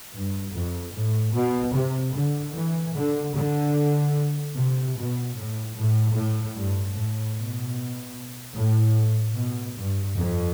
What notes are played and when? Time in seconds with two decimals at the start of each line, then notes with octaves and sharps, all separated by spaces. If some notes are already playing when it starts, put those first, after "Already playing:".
0.15 G2
0.55 F2
0.95 A2
1.34 B2
1.75 C3
2.15 D3
2.55 E3
2.95 D3
3.34 D3
4.56 C3
4.96 B2
5.36 A2
5.76 A2
6.15 A2
6.56 G2
6.95 A2
7.36 B2
8.55 A2
9.36 B2
9.76 G2
10.16 F2